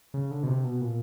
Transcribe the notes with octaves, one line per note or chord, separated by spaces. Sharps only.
C#3
D3
B2
C3
B2
A#2